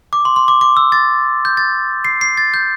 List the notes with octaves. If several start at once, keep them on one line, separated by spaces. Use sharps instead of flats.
D6
C6
C6
D6
D6
E6
A6
G6
A6
C7
C7
A6
G6